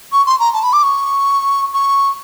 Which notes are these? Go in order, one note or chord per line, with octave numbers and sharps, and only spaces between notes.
C#6
C6
A#5
A5
B5
D6
C#6
C#6